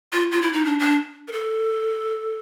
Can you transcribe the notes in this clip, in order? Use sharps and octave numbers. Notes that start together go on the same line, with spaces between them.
F4
F4
E4
D#4
D4
D4
A#4
A4